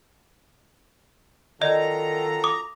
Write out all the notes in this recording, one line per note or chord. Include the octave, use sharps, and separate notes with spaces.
F#2 D#3 F4 A4 D5 D#5 A#5
D6 D#6